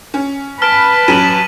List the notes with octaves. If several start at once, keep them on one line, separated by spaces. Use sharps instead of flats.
C#4
B4 A5 F6 B6 D7
A1 F#3 C#4 D#7 F#7